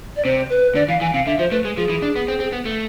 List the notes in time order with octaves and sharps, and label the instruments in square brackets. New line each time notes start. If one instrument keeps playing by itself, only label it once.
[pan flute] D5
[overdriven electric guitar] C3 [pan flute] C5
[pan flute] B4
[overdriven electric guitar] D3 [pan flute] D5
[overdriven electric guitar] E3 [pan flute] F5
[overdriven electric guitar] E3 [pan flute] G#5
[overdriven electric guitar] C3 [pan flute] F5
[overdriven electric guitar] D3 [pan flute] E5
[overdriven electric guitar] F3 [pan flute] C5
[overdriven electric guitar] A3 [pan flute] B4
[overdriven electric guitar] G#3
[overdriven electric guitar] F3 [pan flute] G#4
[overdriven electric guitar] E3
D4
B3
C4
C4
B3
A3